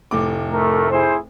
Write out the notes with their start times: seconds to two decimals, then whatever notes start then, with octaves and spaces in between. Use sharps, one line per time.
0.11 F1 A2 D6
0.52 A3 A#4
0.91 E4 G#4 C5